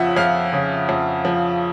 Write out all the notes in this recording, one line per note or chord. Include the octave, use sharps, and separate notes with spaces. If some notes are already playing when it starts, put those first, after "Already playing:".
Already playing: F2 C#3 F3 E5 F#5
F2 F5
C#3
F2
F3